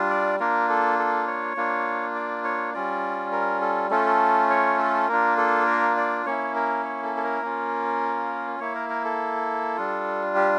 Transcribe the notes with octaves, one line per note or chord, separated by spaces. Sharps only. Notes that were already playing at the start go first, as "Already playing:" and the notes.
Already playing: G3 D4 F4
D5
A#3 D4 F4 A#4
A4
A4
C#5
A#3 D4 F4
D5
C#5
G3 C#4 F4 D5
A#4
A4
A3 C#4 F4 A4
C#5
A4
A#3 D4 F4 A#4
A4
A#4
D5
A#3 C#4 E4 C#5
A#4
C#5
A4
A4
A#4
A#3 C#4 F4
A#3 E4 C#5
A#4
A#4
A4
G3 D4 F4
G4